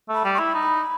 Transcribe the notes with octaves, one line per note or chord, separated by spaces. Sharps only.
A3 B5
G3
C#6
E4 B5
D#4